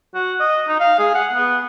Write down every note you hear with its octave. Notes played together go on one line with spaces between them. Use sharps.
F#4
D#5
D#4
F5
G#4
F#5
B3